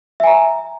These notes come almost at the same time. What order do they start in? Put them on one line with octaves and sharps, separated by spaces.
E5 G#5 A#5